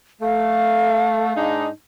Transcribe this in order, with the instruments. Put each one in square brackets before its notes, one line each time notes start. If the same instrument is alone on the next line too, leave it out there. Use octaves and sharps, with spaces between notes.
[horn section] A3 [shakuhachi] F5
[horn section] G#2 D4 D#4